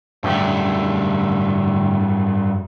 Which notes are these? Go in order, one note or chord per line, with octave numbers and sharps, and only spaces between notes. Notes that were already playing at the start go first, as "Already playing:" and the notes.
F#2 D3 G3 A3 G4